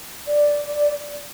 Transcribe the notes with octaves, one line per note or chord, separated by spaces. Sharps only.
D5